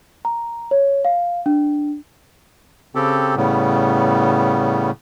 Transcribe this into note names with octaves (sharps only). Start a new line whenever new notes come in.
A#5
C#5
F5
D4
C#3 C4 G4 A4
A2 C#3 G3 B3